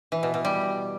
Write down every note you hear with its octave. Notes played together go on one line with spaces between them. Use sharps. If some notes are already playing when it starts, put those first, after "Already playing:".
E3
B2
B2
G3